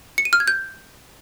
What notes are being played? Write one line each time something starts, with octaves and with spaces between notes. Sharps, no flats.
C#7
D#7
F6
G#6
G6